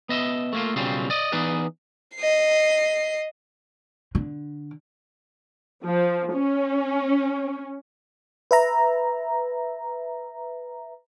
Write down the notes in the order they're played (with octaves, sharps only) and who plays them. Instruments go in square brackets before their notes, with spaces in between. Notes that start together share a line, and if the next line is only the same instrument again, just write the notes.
[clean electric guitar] B3 D#5 E5
A3 A#3 F4
B1 C#3 F#3 G3 C4 F4
D5 D#5
E3 B3 D#4 G#4 B4 D5
[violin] D#5 C7
[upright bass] D3
[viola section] F3
C#4
[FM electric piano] B4 E5 A#5